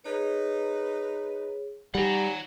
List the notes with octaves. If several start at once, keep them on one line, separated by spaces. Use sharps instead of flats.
D#4 G#4 B4 C#5
G3 D#4 D5 F#5 G#5 A#5